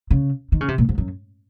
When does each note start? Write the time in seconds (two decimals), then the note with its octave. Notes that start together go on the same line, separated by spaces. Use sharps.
0.11 C#3
0.52 D#3
0.61 C#3
0.68 C3
0.78 A#2
0.89 G#2
0.98 F#2